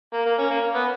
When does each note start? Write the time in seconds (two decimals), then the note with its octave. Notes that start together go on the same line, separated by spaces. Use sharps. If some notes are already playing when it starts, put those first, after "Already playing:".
0.13 A#3
0.26 A#3
0.39 C#4
0.50 A#3
0.75 B3